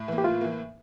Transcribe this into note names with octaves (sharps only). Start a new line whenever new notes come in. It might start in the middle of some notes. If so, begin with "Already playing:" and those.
Already playing: A2
E3 A#3
G4
A2 F4
E3 A#3